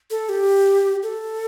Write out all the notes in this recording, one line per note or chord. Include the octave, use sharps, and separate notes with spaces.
A4
G4
A4